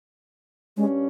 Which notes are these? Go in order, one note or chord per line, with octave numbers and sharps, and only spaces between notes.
G2 G3 G#3 C#4